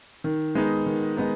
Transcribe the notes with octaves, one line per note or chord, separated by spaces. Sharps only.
D#3
G#3 B3 D#4
D#3
G#3 B3 D#4